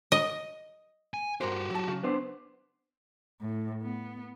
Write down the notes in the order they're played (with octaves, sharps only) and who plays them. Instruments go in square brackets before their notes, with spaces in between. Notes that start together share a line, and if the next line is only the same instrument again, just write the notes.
[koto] D#5
[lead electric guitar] G#5
[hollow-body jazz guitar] G2 A#4 C5 [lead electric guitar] F#4 G4
[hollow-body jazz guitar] F#3 A5
[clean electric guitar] C#3
B3 D4 C5
[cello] A2
B3